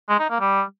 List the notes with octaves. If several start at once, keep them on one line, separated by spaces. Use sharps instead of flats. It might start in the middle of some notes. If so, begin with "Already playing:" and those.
G#3
D#4
A#3
G3